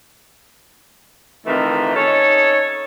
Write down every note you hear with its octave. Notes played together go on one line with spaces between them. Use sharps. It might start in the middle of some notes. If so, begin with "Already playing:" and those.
C3 D#3 E3 A3 C4 F4
C#4 D#4 A4 C#5